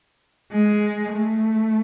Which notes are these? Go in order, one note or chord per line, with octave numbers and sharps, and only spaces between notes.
G#3
A3